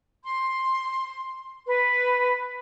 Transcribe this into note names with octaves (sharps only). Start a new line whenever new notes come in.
C6
B4